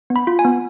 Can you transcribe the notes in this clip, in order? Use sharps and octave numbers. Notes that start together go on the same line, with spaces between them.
B3
B5
F4
G#5
B3